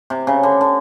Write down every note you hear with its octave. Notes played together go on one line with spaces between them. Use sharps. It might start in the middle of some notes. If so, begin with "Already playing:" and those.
C3
C#3
D3
D3